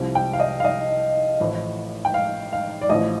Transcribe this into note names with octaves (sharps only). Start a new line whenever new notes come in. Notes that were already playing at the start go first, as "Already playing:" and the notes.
Already playing: C2 C3 F3
G5
F5
D#5
F5
D#5
A1 A2 F3
G5
F5
F5
D5
A1 A2 F3 D#5